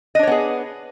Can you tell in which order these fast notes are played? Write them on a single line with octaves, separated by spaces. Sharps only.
D#5 D4 C#5 B3 G#4